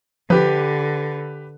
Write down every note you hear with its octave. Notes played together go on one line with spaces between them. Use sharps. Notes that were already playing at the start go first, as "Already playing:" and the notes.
D3 F3 G4 B4